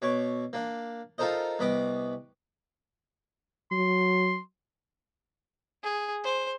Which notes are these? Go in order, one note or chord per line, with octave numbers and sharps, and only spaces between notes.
B2 C#5 D6
A#3 D4
D#4 F4 A4 A#4 C5 D#5
C2 B3 D#5 B5 D6
F#3 C6
G#4
C5